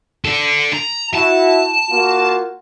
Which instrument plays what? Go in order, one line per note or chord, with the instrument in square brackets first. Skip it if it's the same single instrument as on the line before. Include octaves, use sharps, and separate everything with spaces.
[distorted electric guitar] D4 A4
A#5
[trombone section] E4 F#4 [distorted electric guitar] A5
[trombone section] A#3 F4 F#4